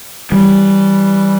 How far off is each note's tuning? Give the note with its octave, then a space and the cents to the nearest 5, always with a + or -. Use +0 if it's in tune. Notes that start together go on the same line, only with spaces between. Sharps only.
E3 +0 G3 +0